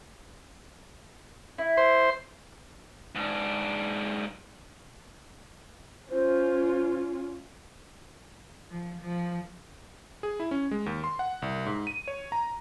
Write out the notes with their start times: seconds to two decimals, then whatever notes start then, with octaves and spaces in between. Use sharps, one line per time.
1.58 E4
1.77 C5
3.15 G#2 D4
6.10 C#4 F4 C5
8.71 F3
9.01 F3
10.23 G#4
10.40 E4
10.51 C#4
10.71 G#3
10.86 D#2
11.04 C6
11.19 F#5
11.42 C2
11.66 G#2
11.87 D#7
12.08 C#5
12.32 A#5